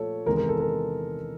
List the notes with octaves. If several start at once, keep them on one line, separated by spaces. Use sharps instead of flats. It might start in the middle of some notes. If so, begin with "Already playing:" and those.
Already playing: A#2 F3 A3 A4 C#5
E2 C3 D#3 G#3 B3 A#4
A#4
A4
A#4